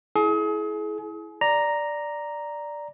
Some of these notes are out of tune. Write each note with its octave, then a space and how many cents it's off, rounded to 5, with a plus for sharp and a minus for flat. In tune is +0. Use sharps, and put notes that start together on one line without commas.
E4 +0 G#4 +35
D5 +0 A#5 +0